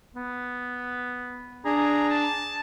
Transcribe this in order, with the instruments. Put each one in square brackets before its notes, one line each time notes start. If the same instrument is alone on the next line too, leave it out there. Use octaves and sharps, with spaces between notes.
[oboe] B3
[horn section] D4 [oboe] G#4 [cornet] A#5
[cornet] A5